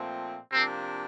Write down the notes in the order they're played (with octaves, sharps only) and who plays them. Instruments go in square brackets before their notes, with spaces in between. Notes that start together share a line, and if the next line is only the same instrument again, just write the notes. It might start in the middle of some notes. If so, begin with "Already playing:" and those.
Already playing: [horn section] A#2 F3 A3 C4
[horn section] C3 F3 A#3 D4 [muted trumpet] C4